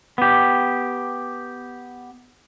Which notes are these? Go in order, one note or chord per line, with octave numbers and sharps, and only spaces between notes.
B3 G4